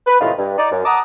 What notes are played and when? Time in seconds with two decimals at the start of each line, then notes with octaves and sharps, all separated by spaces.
0.07 B4
0.21 A2 C3 D#3 G#3 E4 F4
0.38 G2
0.58 D#4 D5
0.72 F#2
0.85 F#5 A5 A#5 D6 D#6